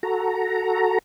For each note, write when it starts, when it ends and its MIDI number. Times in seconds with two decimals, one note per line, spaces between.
0.03 0.98 66
0.03 0.98 69
0.03 0.98 82